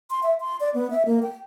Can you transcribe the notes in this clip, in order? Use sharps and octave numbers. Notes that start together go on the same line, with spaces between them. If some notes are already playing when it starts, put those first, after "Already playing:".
C6
E5
C6
D5
B3
E5
A#3
G5